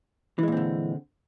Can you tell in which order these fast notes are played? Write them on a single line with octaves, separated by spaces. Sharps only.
E3 G#3 A#2 C4 D3